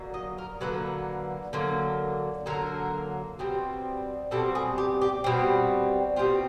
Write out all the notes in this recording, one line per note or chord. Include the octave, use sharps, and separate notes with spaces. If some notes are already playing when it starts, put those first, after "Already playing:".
Already playing: D3 F#3 A#3
D#5
A#4
D3 F#3 A#3 B4
D3 F#3 A#3
D3 F#3 A#3 A#4
B2 G3 C4
B2 G3 C4 A4
G#4
G4
G4
B2 G3 C4
B2 G3 C4 F4